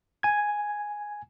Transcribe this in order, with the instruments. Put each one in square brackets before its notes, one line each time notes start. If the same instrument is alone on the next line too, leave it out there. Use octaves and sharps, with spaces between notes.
[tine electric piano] G#5 G#6